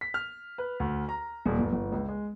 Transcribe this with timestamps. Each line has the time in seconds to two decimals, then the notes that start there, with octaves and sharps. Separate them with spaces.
0.01 B6
0.14 F6
0.58 B4
0.80 D2
1.09 A#5
1.46 D#1
1.59 G1
1.73 G1
1.92 C#2
2.08 G#3